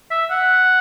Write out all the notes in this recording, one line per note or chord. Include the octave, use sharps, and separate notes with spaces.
E5
F#5